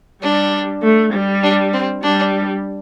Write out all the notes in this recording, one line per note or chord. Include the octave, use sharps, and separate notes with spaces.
G3 D4
A3
G3
D4
C4
G3 D4